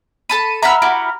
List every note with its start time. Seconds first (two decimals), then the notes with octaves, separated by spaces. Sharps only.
0.29 A4 A5 B5 D#7
0.63 E5 F#5 A#5 B5 E6 F6
0.82 E4 F#4 G4